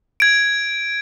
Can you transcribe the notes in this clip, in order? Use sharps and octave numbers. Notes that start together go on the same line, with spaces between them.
G#6 D7